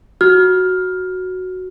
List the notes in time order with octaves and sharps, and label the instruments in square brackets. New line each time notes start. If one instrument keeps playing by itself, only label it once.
[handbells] F#4 [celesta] F6